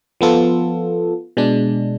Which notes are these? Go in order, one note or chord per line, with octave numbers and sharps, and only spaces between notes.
F3 B3 F4 A4
B2 G#3 D4